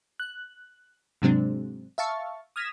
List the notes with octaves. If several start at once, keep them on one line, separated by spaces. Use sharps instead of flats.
F#6
G#2 C3 F#3 G#3 C4 D4
E5 F5 A5 C#6
D#6 F6 G#6 A#6 B6 E7